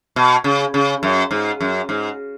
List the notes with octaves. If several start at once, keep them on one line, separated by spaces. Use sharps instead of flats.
B2
C#3
C#3
F#2
G#2
F#2
G#2